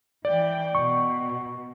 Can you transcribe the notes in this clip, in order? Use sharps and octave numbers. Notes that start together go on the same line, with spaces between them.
E3 D5 G5
B2 C#6